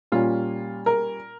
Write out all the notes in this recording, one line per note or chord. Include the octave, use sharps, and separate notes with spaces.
A#2 G3 A#3 C#4 F4
A#4